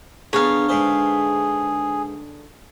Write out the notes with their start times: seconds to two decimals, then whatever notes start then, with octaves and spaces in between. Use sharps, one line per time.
0.33 D3 B3 D4 G#4 C#5 F5 A#5
0.69 G#2 G#4 B4 C5